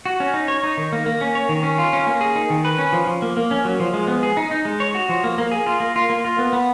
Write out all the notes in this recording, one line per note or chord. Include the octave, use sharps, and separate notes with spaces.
F#4
C#4
D#4
C#5
D#4
D#3
A#3
A#3
C#4
C#5
D#3
C#4
F4
C#4
A#3
G#4
D#4
D#3
B4
C#4
F3
F3
A#3
A#3
C#4
F#3
F3
G#3
B3
G#4
D#4
D#4
G#3
C#5
F#4
F3
A#3
A#3
G#4
F4
A#3
F4
A#3
F4
B3
B3